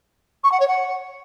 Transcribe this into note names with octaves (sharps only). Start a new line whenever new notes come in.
C#6
F#5
C#5
F#5